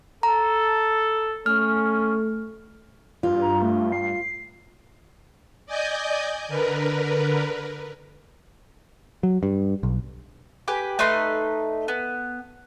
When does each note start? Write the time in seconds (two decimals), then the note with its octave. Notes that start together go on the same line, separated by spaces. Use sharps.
0.23 A4 A#5
1.46 A3 C#4 F6
3.23 G2 F4
3.42 A#5
3.62 A3
3.92 C7
5.66 D5 D#5 G#5 G6
6.48 D3 A#4 B4
9.23 F#3
9.43 G2
9.83 B1
10.68 G4 B4 G#5
10.99 A3 D#4 B4 C6
11.88 B3